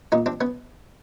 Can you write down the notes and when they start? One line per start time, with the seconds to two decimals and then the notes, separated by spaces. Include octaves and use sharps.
0.12 A#2 C#4 D#4
0.26 C4 D4
0.41 B3 C#4